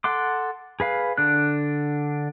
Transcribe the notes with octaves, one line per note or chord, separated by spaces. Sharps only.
A4 F#5 C6 D6
G#4 B4 F5
D3 D4 F#6